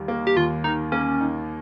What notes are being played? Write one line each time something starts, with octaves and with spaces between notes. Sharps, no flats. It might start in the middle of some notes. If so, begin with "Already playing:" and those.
Already playing: D#2 D#3 G3
A#3
G4
D#2 F4
D#3 D#4
A#3 C#4
D#4